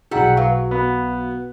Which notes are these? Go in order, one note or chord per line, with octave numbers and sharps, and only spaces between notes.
B1 G3 E4 F#4 G#4 F#5 A#5
F#3 B4 F5
B3